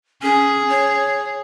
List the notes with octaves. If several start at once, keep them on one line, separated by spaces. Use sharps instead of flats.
C#4 G#4
C#5